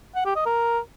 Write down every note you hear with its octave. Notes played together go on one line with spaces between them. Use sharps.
F#5
G4
D#5
A#4